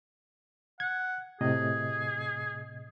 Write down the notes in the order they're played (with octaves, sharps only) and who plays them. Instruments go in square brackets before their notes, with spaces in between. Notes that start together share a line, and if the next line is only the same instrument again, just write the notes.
[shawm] F#5 [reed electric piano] G#6
[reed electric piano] A2 C3 D#5 [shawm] G#4